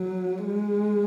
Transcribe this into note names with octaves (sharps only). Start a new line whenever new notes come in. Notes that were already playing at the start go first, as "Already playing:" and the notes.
Already playing: F#3
G#3